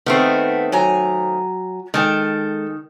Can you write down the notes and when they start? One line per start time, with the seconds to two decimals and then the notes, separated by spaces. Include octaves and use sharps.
0.06 D#3 A3 B3 C4
0.72 F#3 G#5 A#5
1.94 D#3 G#3 A4 G5